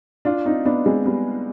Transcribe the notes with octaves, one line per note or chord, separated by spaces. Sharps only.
D4 F4
C4 D#4
B3 D4
G#3 C4
G3 B3